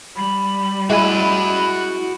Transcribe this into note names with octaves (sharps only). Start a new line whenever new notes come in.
G3 B5
G#3 E4 F#4 G#5 B5